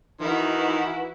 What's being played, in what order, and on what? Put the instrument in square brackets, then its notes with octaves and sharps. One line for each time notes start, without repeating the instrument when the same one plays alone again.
[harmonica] D#3 [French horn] E3 [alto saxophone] D#4 [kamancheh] E4 F#4